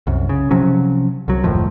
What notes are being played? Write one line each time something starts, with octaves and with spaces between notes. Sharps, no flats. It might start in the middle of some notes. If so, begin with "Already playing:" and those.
C2 F#2
C#3
C3 F3 F#3 C#4
C2 F#3
F#1 D#2 A2 F3